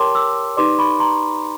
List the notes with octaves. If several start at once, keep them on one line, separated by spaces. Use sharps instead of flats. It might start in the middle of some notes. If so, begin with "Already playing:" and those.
Already playing: G4 A#4 C#5 G5 A5 C6 D6
D6 E6
D#4 G4 B4 D5 C6 D6
B5 C#6
A#5 C6